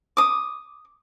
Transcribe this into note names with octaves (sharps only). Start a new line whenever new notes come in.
D6 D#6